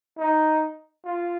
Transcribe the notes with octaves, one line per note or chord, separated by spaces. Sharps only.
D#4
F4